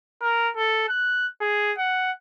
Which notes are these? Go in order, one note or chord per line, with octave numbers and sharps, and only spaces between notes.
A#4
A4
F#6
G#4
F#5